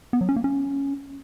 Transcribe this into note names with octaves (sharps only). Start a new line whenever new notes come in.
B3
F#3
C#4
A#3
C#4